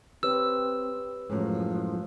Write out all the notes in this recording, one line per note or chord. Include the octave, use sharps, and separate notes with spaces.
C4 G4 B4 C#5 E6
F#2 A2 F3 G#3